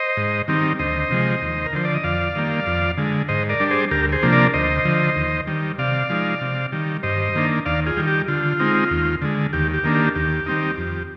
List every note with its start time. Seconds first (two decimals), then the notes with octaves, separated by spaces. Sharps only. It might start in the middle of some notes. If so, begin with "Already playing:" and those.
Already playing: C5 D#5
0.17 G#2
0.48 D#3 G3 C4 D#4
0.79 D2 C5 D#5
1.10 C3 F3 G#3
1.42 D#2
1.66 A#4
1.73 D3 F3 C5
1.85 D5
1.94 D#5
2.04 F2 D5 F5
2.35 D#3 G3 A#3
2.66 F2
2.97 D3 G#3
3.28 G#2 C5 D#5
3.49 A#4 D5
3.60 G3 D4
3.70 G#4 C5
3.91 D2 G4 A#4
4.12 G#4 C5
4.22 C3 F3 A#3 D4
4.33 A#4 D5
4.54 D2 C5 D#5
4.85 D3 F3
5.16 D#2
5.47 D#3 G3
5.78 C3 D5 F5
6.10 F3 G#3 D#4
6.41 C3
6.72 D#3 G3
7.03 G2 C5 D#5
7.35 D#3 A#3 D4
7.66 D#2 D5 F5
7.86 F4 G#4
7.97 D#3 G3
8.07 G4
8.28 D3 F4
8.60 G#3 C4 D#4
8.91 D#2
9.22 D3 G#3
9.53 D#2 G4
9.74 G4
9.84 D#3 A#3 D4
9.95 G4
10.15 D#2 G4
10.46 D#3 G3 C4 D#4
10.78 F2